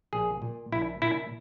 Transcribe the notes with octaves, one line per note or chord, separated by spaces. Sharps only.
A#1 G#4
A#2
A#1 E4
A#2 E4